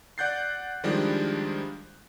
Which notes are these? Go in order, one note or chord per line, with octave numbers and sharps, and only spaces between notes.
D5 F#5 F#6 G6 A6 C7
D#3 F3 G3 G#3 D4 E4